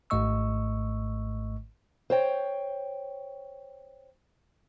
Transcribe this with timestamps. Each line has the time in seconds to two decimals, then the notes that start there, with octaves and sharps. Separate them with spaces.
0.10 G#1 G#2 A3 D#5 C#6 E6
2.10 C5 C#5 G5